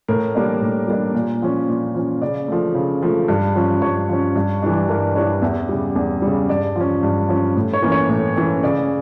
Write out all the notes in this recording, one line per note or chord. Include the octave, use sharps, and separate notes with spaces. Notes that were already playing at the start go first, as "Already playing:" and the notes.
A2 A#4
G3 A#3 D4
A2
G3 A#3 D4
A#2
F3 C#4
A#2
F3 C#4
C#3 D5
F3 A3
C#3
F3 A3
G2
F3 C#4
G2 C#5
F3 C#4
G2
E3 G3 D4
G2 A#4
E3 G3 D4 C#5
E2 E5
C#3 G3
E2
C#3 G3
G2 D5
F3 C#4
G2
F3 C#4
A2
C#5
E3 A#3 C#4
C#5
A2
E3 A#3 C#4
C#3 D5